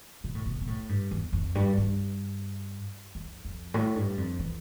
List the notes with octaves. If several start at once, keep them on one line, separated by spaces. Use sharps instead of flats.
B2
A2
B2
B2
A2
G2
E2
F2
G2
G2
F2
F2
A2
G2
F2
E3